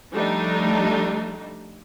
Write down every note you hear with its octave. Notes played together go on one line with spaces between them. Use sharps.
F3 G3 A3 D4 D#4